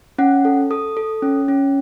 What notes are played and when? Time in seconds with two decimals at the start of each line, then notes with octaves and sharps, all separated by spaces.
0.18 C#4 F#5
0.45 A4
0.70 A4 D#6
0.97 A4
1.22 C#4
1.48 C#4